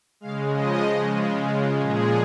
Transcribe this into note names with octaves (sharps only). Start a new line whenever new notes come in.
C#3 G#3 F5
C#3 F3 G#3 D#5
C#3 G#3
C#3 G#3 F4
C#3 G#3 F4
A#2 F3 G#3 G#4